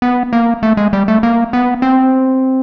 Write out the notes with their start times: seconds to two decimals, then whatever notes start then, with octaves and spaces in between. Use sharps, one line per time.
0.02 B3
0.33 A#3
0.63 A3
0.77 G#3
0.93 G3
1.08 A3
1.23 A#3
1.53 B3
1.82 C4